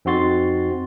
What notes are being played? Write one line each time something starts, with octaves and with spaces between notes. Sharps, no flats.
F2 C4 D#4 F#4 C6 A6